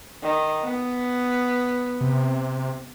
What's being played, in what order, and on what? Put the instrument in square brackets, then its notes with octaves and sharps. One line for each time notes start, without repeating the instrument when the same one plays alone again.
[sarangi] D#3
B3
[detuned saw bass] C3